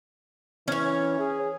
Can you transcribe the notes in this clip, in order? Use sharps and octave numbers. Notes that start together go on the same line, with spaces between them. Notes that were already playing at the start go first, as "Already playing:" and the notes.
E3 C#4 C#5
G#4